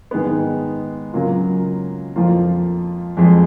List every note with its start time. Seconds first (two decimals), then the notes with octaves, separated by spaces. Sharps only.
0.11 G#2 D#3 G#3 B3
1.13 C#3 F#3 A#3 F4
2.16 F2 F3 A#3 F4 A#4
3.17 F2 F3 G#3